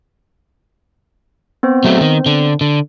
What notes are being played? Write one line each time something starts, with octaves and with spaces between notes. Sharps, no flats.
B3 C4 C5
F#3 A3
D#3
D3
D3